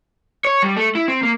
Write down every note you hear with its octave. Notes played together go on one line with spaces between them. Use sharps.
C#5
G3
A3
E4
C4
A#3